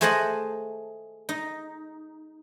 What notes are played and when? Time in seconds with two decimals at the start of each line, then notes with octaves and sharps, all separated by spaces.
0.01 A3 G#4 C5 D#5 F#5 A5
1.29 D#4